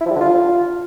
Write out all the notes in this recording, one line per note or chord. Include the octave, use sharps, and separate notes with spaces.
E4
F3
G3
D3
F4